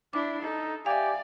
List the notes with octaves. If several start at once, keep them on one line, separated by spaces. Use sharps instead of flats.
D4 E4 D6
D#4 A4
G4 D5 E5 F5 G#5